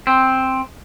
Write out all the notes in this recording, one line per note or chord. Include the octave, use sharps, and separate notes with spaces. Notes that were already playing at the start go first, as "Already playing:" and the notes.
C4